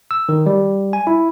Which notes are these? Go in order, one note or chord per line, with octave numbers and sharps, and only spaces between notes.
E6
D#3
G3
G#5
E4